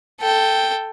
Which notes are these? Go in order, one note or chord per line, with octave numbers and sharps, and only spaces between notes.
A4 G5